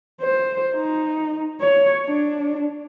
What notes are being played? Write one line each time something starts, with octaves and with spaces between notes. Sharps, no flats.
C5
D#4
C#5
D4